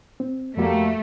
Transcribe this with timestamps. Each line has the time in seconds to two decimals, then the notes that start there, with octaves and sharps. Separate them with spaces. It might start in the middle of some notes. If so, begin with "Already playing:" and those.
0.20 C4
0.57 F2 G3 A3 A#3 F#4